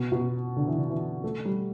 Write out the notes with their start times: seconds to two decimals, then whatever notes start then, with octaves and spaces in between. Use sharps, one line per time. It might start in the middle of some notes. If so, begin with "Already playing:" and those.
Already playing: B2
0.12 B2
0.56 D3
0.67 E3
0.78 D3
0.89 E3
1.24 A3
1.45 G3